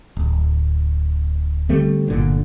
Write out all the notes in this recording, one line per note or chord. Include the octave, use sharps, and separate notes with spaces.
D1
D3 G3 A3 C4
G1 A#2 D3